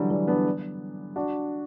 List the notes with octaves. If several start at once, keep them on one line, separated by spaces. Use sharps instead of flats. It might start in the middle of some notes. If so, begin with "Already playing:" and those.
Already playing: D3 E3 F#3 G3
E3 G3
B3 D4
D4 F#4